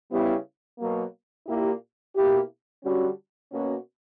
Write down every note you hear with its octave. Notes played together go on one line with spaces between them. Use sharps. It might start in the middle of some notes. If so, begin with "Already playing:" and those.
C#3 G3 B3 E4 G4
B2 F#3 A#3
A#2 A#3 E4 G4
B2 A#3 E4 G4
D3 G3 C#4 F#4
B2 A#3 C#4 F#4